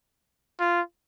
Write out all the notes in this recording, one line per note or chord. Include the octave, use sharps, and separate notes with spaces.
F4